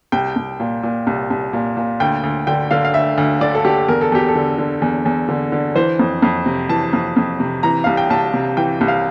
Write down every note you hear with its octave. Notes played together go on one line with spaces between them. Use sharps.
C2 G5
C2
A#2
A#2
C2
C2
A#2
A#2
D2 G5
D2
D3 G5
D3 F5
F5
D2 E5
D2
D3 D5
A4
D3 G4
E2 A#4
A4
E2 G4
A4
D3
D3
E2
E2
D3
D3
E3 C5
F2
F2
C3
E3 A5
F2
F2
C3
E3 A#5
C2 F5
G5
C2 A5
C3
E3 G5
C2
F5